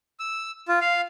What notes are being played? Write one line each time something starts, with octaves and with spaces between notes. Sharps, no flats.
E6
F4
F5